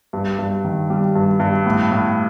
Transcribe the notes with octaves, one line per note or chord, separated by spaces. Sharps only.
G2
G2
D#3
G3
G2
G2
A2
A2